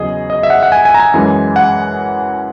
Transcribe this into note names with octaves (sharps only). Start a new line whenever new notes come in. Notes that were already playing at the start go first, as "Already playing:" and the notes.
Already playing: E2 C#3 F#3 G#4 D#5
D#5
E5
F#5
F#5
G#5
G#5
A#5
G#5
F#2 E3 G#3
F#5